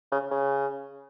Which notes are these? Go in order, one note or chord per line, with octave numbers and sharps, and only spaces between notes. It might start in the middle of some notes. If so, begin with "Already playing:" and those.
C#3
C#3